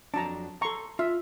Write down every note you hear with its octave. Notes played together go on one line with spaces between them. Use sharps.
F2 F#3 D4 A5 A#5
A4 A#5 C6 C#6
F4 E5